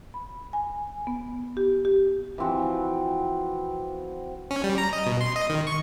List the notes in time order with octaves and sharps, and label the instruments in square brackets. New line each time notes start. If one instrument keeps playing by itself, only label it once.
[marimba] B5
G#5
B3
G4
G4
[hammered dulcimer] E3 F3 C4 F#4
[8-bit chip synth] C#4
G3
A#5
D#5
B2
C6
D#5
D#3
C#6